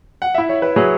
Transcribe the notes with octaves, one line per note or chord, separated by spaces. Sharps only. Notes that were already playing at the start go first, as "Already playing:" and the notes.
F#5
E4 E5
C#5
B4
F#3 G#4